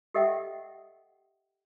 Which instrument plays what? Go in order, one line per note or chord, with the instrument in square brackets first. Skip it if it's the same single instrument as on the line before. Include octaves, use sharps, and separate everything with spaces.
[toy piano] G4 A4 D#5 E5 F#5 G5